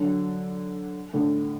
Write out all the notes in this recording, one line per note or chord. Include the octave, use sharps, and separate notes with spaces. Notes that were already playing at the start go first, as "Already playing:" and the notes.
Already playing: D3 F#3
A2 D3